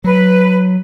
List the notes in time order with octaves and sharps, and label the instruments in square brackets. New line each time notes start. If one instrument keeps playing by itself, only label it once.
[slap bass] F#3 [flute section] B4